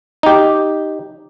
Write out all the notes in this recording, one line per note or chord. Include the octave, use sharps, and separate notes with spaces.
D#4 G4